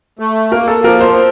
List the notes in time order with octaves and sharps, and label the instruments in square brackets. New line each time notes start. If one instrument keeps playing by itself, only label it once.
[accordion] A3
[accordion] A#3 [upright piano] A#4
[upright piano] A4
[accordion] F3 [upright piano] A#4
[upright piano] C5